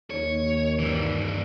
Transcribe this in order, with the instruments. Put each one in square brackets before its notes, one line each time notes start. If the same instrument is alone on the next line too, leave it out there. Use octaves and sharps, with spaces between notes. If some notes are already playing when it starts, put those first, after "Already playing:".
[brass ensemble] D#2 [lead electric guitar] C#5
[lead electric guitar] G2 E3